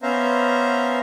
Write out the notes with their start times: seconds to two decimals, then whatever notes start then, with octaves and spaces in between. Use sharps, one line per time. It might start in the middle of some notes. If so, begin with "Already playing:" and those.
0.02 B3 C#4 C5 E5 F5 A#5